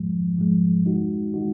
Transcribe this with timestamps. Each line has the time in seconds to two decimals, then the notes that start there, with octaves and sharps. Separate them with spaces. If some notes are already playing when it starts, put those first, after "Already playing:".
Already playing: G#2 F3 G#3
0.36 G#2 F3 G#3
0.85 G#3 D#4 F#4
1.34 G#3 D#4 F#4